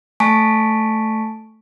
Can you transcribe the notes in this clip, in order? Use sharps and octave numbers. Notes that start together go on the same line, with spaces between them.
A3 G#5 A5 C#6 B6 D7